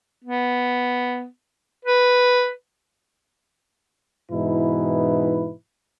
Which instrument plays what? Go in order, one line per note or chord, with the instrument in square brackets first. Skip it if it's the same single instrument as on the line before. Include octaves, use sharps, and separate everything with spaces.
[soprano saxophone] B3
B4
[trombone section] G#2 B2 E3 D#4 E4 B4